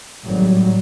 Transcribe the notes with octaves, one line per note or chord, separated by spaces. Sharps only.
G#1 A2 F#3 G3